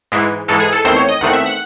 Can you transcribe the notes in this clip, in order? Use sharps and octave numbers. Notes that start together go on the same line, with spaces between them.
G#2 E3 G#3
G#2 E3 G#3 A4
G#4
A4
E2 D#3 A3 C4 C5
C#5
D#5
E2 D#3 A3 C4 F#5
E5
F#5